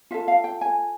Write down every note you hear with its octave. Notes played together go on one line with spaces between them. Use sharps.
F4 A4 E5
F5
G5
G#5